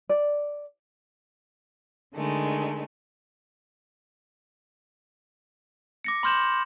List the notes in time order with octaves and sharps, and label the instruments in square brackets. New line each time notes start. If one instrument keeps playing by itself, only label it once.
[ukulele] D5
[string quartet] D3 D#3 G#3 A3
[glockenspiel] D6 A#6 C#7
B5 C6 F6 G6 E7 F#7